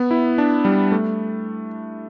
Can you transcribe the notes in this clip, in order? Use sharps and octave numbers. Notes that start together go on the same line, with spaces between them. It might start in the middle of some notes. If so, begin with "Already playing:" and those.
Already playing: B3
E4
D4
G3
A3